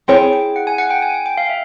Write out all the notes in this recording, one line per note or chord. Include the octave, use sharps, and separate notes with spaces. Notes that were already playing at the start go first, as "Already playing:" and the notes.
C4 E4 G#4 C#5 G5
G5
F#5
G#5
F#5
G5
G#5
G#5
G5
F5
E5